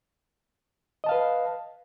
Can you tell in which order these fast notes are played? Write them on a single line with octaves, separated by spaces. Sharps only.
D#5 A5 F5 B4